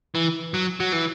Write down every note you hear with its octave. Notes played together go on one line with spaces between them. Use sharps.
E3
F#3
F#3
E3